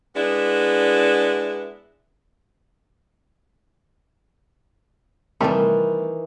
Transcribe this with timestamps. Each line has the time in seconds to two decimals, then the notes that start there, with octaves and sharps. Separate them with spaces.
0.15 G#3 B3 D4 E4
5.40 C3 D#3 E3 G3 A3